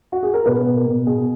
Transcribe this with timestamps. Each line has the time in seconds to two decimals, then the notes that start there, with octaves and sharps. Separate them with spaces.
0.12 F#4
0.23 G#4
0.34 A#4
0.45 B2 B4
0.66 B2
0.76 A#4
0.86 B2
1.06 B2 G#4